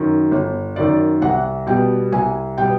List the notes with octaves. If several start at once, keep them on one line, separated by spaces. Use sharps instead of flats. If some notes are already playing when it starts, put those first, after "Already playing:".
Already playing: F#2 D#3
G1
F#2 D#3 D5
C2 F#5
B2 G3 B3 G5
C2 G#5
B2 G3 B3 G5